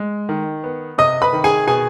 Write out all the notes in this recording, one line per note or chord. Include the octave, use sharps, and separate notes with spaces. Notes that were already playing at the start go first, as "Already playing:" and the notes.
Already playing: G#3
D#3
B3
C3 D#5 D#6
B4 B5
D#3
G#4 G#5
B2 G#4 G#5